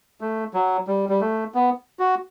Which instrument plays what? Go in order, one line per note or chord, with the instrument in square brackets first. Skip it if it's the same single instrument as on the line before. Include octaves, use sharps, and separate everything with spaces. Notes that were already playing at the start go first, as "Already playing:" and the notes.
[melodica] A3
F#3
G3
G3
A3
B3
F#4